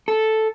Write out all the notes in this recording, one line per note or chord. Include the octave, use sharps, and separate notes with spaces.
A4